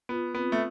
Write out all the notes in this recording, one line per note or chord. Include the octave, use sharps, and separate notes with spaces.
B3 F4
B3 C4
A3